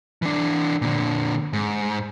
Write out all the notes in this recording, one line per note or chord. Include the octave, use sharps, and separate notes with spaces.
E3 D4
A#2 D3
G#2